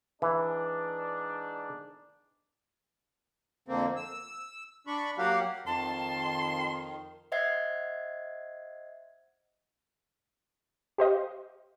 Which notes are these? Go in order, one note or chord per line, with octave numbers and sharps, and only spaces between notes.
G#2 E3 D4
F2 D3 A#3 C4
E6
D4 B5 C#6
F#3 A#3 F#4 G4 F5 F#5
F2 D#3 A5 C6
C5 D#5 E5 F#5 G#6 C7
G4 C5 D#5 F5